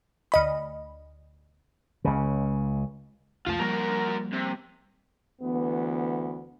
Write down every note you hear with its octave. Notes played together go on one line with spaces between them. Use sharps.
D2 D#5 B5
C#2 C#3
C2 F2 A3 F4 A5
F3 G3 A#3 F#4 A#4
C3
D2 E3 B3